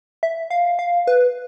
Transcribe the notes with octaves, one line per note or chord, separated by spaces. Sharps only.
E5
F5
F5
B4